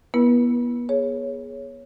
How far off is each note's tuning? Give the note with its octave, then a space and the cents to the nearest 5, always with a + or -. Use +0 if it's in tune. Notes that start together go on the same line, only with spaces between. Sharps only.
B3 -30 E4 +10 B4 -40
G#4 +0 C#5 +0